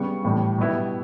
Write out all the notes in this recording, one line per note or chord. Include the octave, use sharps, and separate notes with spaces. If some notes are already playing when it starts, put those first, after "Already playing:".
Already playing: C#3 G3 B3 C#6
A2 E3 G3
B2 G3 B3 E4